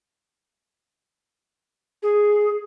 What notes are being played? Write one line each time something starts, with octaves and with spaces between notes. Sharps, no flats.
G#4